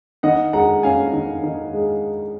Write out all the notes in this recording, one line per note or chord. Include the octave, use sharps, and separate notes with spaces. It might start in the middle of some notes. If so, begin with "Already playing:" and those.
D#3 D#5 F#5
G#3 F#5 A#5
C#4 F5 G#5
D#3
D#3
G#3